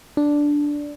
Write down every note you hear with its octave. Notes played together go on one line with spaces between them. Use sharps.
D4